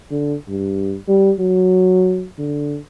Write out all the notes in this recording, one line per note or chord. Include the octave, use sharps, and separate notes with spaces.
D3
G2
G3
F#3
D3